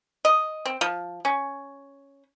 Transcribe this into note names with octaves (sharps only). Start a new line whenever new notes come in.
D#5
C4
F3
C#4